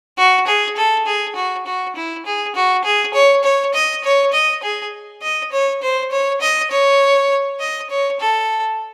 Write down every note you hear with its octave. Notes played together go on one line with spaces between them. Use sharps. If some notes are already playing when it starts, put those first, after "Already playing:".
F#4
G#4
A4
G#4
F#4
F#4
E4
G#4
F#4
G#4
C#5
C#5
D#5
C#5
D#5
G#4
D#5
C#5
C5
C#5
D#5
C#5
D#5
C#5
A4